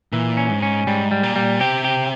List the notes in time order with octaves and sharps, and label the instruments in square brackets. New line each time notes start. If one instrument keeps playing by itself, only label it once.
[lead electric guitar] A#2 [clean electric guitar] E3
[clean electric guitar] C#4
[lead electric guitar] G#2
[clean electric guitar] C#4
[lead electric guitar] G#2 [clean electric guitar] G3
[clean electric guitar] G3
[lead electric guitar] A#2
[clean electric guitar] G3
[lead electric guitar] C3 [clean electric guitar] G4
[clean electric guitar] G4